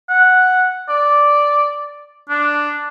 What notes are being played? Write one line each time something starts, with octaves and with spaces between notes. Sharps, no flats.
F#5
D5
D4